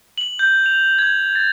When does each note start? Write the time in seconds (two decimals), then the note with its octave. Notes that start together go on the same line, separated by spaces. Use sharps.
0.18 F#7
0.39 G6
0.66 F7
0.99 G#6
1.35 A6